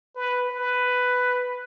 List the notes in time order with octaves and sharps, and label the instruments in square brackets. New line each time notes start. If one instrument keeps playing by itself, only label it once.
[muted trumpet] B4
B4